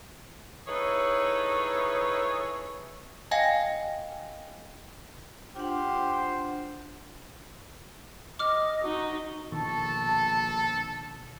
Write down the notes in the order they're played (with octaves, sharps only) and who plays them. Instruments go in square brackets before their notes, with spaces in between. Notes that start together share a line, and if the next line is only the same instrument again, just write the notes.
[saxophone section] D#4 E4 G#4 A4 B4 C#5
[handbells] D#5 F5 G5 G#5 A#6
[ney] D4 [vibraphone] F4 F#5 [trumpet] G4 [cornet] C5
[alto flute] D#5 [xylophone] D6 F6
[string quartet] D#4 [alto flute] F#4
[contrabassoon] A#1 [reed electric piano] B2 D#3 C#6 [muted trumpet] A4 [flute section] A5